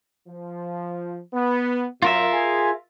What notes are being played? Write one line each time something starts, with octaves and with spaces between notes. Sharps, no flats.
F3
B3
F#2 F4 A#4 E5
G#4 G#5